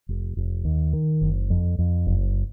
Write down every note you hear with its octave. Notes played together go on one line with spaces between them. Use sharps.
F1
F1
D#2
D#3
F#1
F2
F2
F#1